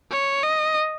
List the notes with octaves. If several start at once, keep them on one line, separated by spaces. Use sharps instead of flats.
C#5
D#5